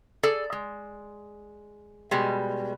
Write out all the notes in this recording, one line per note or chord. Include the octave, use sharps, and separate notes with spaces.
G#4 A4 D5
G#3
B2 G3 G#3